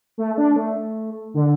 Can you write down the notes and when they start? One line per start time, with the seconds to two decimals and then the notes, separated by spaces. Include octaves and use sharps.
0.18 A3
0.38 D4
0.56 A3
1.34 D3